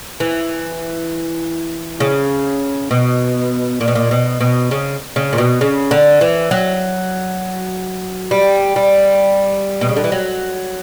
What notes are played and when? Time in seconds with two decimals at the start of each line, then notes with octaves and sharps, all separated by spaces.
0.20 E3
2.00 C#3
2.91 B2
3.81 A#2
3.88 B2
3.95 A#2
4.11 B2
4.41 B2
4.71 C#3
5.16 C#3
5.33 A#2
5.38 B2
5.61 C#3
5.91 D3
6.21 E3
6.51 F#3
8.31 G3
8.76 G3
9.81 B2
9.89 C#3
9.96 D3
10.04 E3
10.12 F#3